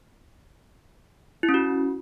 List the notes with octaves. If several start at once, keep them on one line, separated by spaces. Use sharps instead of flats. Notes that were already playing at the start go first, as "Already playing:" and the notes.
E4
C#4
F#4